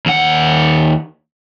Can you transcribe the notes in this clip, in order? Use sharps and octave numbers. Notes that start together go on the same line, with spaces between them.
D#2 F#5